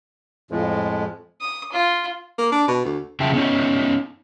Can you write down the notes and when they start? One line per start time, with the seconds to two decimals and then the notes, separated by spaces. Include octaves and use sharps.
0.51 F2 A2 F3 G#3
1.41 D#6
1.72 F4
2.38 A#3
2.52 D4
2.68 B2
2.85 D2
3.20 C#3 F3 G#4 E5 G5 A5
3.33 B3 C#4 D#4